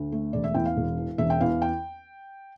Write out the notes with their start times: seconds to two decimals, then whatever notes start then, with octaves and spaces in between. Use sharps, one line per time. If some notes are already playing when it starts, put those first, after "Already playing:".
Already playing: D2
0.12 A3
0.33 E1 D5
0.44 E5
0.54 E2 G5
0.65 F5
0.77 E1
0.97 E3
1.18 E1 E5
1.30 G5
1.41 E2 F5
1.62 G5